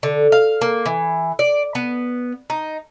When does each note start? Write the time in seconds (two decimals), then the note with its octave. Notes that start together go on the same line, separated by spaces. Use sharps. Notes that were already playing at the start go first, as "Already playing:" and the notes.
0.03 D3
0.32 F5
0.61 A#3
0.86 E3
1.39 D5
1.75 B3
2.50 D#4